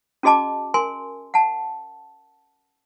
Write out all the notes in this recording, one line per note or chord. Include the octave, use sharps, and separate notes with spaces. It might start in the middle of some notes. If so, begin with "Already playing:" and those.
C#4 F#4 G#4 D#5 A5 D6
A#4 G#5 C6
F#5 A5